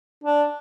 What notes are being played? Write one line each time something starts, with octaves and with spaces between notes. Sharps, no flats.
D4